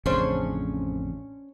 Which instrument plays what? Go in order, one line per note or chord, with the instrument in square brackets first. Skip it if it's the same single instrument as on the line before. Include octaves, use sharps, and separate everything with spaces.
[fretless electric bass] A1 F2 C#3 [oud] C#4 D4 C5